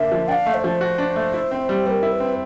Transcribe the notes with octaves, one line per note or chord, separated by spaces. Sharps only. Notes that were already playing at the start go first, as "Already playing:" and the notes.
Already playing: D3 A#3 D4 E5
F3
D4 F5 G5
A3
C5
F3
F#4
D4
A3
E4
C4
G3
G3 A#4 B4
E4
B4
C4